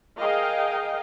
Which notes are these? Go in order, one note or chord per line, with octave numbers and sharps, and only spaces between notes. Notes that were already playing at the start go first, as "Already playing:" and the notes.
G#4 A#4 D#5 F5 G5